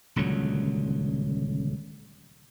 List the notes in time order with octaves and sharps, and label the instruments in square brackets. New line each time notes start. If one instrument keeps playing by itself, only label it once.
[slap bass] D#1 C#2 D3 F#3